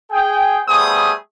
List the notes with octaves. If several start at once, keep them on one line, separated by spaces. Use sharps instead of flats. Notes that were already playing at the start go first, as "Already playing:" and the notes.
G#4 G5
G3 A3 B3 G#4 C5 D#6